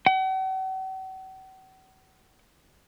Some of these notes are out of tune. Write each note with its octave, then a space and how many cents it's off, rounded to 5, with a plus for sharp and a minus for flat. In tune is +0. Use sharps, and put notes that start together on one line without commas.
F#5 +45